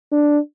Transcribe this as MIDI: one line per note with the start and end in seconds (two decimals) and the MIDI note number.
0.12 0.39 62